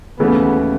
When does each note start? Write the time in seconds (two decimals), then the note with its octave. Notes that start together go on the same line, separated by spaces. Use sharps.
0.20 D#2 C#3 E3 A3 B3 C#4